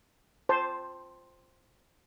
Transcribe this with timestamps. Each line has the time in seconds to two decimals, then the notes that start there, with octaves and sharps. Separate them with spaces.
0.49 C5 A5